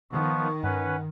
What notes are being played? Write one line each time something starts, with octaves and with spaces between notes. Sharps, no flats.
D#3 F3 B3 C#6
G2 C#4 B4 F#5